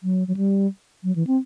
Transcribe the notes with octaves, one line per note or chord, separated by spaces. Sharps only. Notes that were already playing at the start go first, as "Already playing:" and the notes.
F#3
F#3
G3
F#3
E3
C4